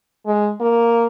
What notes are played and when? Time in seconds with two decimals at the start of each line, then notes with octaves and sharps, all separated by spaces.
0.26 G#3
0.61 A#3